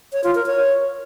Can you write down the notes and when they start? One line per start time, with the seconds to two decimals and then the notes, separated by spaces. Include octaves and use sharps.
0.13 C#5
0.24 F4
0.35 A#4
0.46 C#5